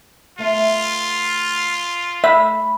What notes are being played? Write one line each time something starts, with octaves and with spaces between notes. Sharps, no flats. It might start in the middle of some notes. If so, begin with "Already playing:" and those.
A3 B3 F4 E5
A3 E5 B5